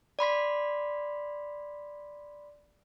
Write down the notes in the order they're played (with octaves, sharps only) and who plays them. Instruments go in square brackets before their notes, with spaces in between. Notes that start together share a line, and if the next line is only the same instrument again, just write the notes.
[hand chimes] D5 B5 C6 B6